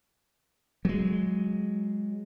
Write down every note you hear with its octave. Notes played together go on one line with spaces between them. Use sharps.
F#3 G#3